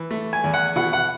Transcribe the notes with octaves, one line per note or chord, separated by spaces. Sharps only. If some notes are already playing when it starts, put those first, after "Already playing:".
Already playing: E3
A3
G#5
E2
F#5
B2 F#5
F#5